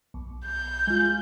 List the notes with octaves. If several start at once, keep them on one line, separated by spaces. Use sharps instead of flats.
B1
G6
G#3 F4